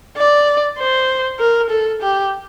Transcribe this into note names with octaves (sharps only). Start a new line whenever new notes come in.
D5
C5
A#4
A4
G4